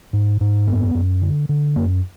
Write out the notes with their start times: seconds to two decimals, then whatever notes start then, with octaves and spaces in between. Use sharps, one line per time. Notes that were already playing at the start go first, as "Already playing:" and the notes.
0.13 G#2
0.41 G#2
0.68 F#2 B3
0.95 F#2
1.22 D3
1.49 D3
1.76 F#2 A#3